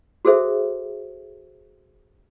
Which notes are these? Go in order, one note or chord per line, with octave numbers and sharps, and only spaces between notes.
F#4 G#4 A4 C5 E5